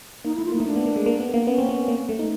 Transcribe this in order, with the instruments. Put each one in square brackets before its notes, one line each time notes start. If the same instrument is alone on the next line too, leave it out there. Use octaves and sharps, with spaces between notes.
[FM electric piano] A#3 [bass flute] D#4
[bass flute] E4
[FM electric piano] A3
[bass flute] F4
[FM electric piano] A#3 [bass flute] D#4
[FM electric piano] A3
[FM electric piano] A#3 [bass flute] D4
[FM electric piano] B3
A#3
G#3
A#3
B3
A#3
[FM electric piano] B3 [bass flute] C#4
[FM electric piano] C4
B3
A#3
A3
D#4